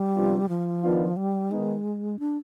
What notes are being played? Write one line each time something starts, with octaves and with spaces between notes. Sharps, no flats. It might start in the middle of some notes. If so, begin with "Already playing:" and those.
Already playing: G3
C3 F3 B3 D4 F4
F3
D#3 B3 D4 F4
G3
D#3 G#3 B3 D#4
D4